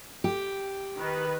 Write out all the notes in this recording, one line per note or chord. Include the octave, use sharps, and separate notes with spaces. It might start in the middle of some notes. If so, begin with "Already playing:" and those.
G4
D#3 B4